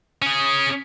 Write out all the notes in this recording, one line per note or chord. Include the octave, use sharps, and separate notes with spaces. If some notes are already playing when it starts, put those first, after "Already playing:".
C#4 G#4